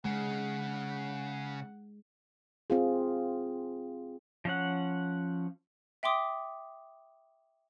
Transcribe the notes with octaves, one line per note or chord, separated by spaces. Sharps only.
C#3 G#3 F#5
C4 F4 G#4
F3 C#4 F#5
E5 G5 C6 D6 D#6